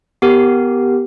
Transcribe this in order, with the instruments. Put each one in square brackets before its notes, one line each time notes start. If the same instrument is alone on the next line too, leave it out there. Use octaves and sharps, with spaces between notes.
[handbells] B3 G4 A#4